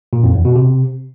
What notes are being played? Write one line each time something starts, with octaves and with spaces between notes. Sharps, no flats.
A#2
F2
E2
B2
C3